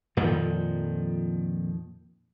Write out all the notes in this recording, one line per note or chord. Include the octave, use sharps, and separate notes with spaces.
F2 A#2 D#3 F3